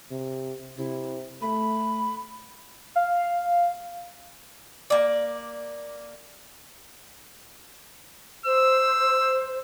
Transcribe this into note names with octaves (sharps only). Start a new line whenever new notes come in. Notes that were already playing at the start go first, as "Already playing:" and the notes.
C3
C3 E4
A3 B5
F5
A#3 D5
C5 E6